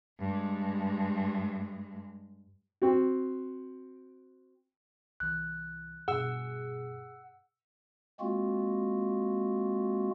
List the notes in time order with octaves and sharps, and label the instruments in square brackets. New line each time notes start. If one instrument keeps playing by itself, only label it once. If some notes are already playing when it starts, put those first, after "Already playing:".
[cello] G2 G#3
[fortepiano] C4 F#4
[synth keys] C2 E3 [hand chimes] F#6
[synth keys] G2 B2 [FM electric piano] G#4 [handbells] F#5 E6
[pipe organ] G#3 A#3 C4 F4 F#4